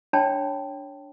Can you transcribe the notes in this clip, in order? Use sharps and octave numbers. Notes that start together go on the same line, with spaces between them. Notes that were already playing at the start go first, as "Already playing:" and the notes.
D4 C#5 G5 A5 B5